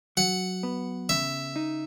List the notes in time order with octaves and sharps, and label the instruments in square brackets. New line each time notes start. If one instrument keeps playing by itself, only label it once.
[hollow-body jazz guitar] F#3 [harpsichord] F#5
[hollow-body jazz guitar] B3
[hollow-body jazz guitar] C#3 [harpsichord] E5
[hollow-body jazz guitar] D#4